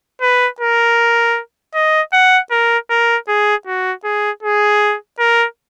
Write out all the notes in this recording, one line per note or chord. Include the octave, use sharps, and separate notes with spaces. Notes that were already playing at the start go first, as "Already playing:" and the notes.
B4
A#4
D#5
F#5
A#4
A#4
G#4
F#4
G#4
G#4
A#4